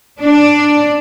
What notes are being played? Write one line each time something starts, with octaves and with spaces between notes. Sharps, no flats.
D4